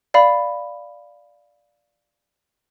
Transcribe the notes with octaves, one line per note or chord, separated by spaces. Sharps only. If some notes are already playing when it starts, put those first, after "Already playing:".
D5 F5 B5